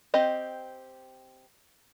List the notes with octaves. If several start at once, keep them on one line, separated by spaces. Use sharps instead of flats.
C4 G4 D#5